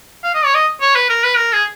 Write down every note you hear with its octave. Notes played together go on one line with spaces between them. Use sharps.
F5
D#5
C#5
D#5
C#5
B4
A#4
B4
A#4
G#4